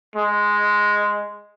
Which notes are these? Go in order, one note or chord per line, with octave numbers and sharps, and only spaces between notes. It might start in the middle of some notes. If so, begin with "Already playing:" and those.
G#3